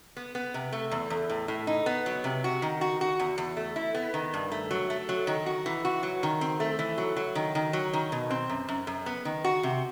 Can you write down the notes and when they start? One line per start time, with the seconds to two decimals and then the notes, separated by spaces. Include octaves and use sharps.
0.17 B3
0.35 B3
0.54 C3
0.72 A3
0.91 E2
1.10 E2
1.29 A2
1.48 A2
1.67 D#4
1.86 B3
2.06 F#3
2.24 C3
2.44 F#4
2.62 D#3
2.81 F#4
3.01 F#4
3.20 E2
3.38 E2
3.57 A3
3.76 E4
3.94 B3
4.14 D#3
4.34 G2
4.52 A3
4.71 F#3
4.90 A3
5.09 F#3
5.27 D#3
5.46 F#4
5.66 E3
5.85 F#4
6.03 F#3
6.23 D#3
6.41 C4
6.60 A3
6.79 E3
6.98 F#3
7.16 F#3
7.35 D#3
7.55 D#3
7.73 F#3
7.93 D#3
8.12 B2
8.30 C4
8.49 F#2
8.69 F#2
8.87 F#2
9.06 B3
9.25 D#3
9.44 F#4
9.63 C3